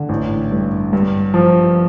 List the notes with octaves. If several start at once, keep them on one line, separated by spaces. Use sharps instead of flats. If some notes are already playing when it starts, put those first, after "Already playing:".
Already playing: D3
A1
G2
G2
F3